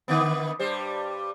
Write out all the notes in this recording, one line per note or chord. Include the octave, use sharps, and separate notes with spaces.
D3 D#3 B3
G2 G3 C5